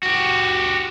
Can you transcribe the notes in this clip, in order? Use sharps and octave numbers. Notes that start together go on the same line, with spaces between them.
F#4 G4